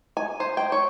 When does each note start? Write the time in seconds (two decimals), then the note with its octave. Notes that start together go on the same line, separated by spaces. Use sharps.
0.17 G#5
0.40 C5
0.57 G5
0.72 C#5